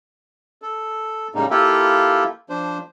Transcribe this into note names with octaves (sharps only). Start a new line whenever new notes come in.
A4
A2 C#3 G3 G#3 A#3 D#4
A#3 E4 F4 G4 A4
F3 D4 C5